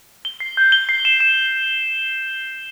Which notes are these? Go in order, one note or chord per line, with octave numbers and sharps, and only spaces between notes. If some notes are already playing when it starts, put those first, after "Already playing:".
G7
C7
G6
G7
C7
E7
E7